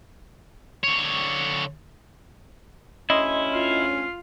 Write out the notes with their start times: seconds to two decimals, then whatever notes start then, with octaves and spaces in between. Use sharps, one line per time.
0.84 D3 C#5
3.10 D2 C#4 E4 D#5 C6
3.52 F4 F5